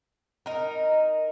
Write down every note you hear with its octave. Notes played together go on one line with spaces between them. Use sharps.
D#4 A#4